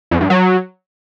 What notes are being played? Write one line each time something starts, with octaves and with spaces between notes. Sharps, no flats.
F2
G2
F#3